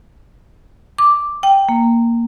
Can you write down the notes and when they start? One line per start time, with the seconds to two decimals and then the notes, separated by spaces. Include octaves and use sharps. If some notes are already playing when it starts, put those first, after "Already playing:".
0.98 D6
1.43 G5
1.69 A#3